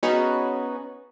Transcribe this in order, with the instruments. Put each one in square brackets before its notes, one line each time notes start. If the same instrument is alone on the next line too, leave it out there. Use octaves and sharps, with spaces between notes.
[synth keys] B3 C#4 D#4 F#4 G#4 B4